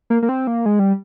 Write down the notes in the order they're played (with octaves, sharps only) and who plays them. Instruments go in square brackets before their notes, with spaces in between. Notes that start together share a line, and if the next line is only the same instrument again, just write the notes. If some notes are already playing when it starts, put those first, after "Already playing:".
[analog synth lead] A#3
A#3
C4
A#3
G#3
G3